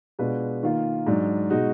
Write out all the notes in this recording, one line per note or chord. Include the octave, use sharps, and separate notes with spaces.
B2 G#3 D4 F4 B4
D#3 A#3 F4
G#2 F#3 D4
B2 G#3 D#4 F#4